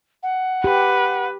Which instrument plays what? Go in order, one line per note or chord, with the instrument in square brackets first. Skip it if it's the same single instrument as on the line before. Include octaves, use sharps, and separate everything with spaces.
[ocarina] F#5
[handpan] G4 [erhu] B4